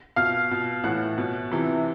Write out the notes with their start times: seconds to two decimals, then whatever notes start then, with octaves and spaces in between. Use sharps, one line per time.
0.16 B2 F5 F6
0.51 B2
0.84 A2 E3 F#5 F#6
1.18 B2
1.52 C3 E3